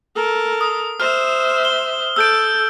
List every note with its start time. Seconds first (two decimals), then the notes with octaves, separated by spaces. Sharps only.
0.16 A4 A#4
0.61 D#6
1.00 C5 E5 F6
1.65 G7
2.16 A4 E6 G6 D7